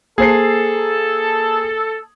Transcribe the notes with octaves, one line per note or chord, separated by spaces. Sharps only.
A#3 G#4 A4 C5 C7